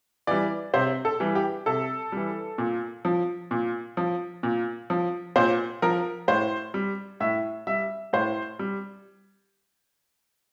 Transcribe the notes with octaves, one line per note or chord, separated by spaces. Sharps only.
E3 G3 D5
C3 C5
A4
E3 G3
G4
C3 A4
E3 G3
A#2
F3
A#2
F3
A#2
F3
A#2 C5
F3 A#4
A2 C5
G3
A2 E5
G3 E5
A2 C5
G3